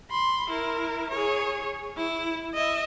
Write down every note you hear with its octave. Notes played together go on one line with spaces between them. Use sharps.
B5 C6
E4 A#4
G#4 C#5
E4
D#5 E5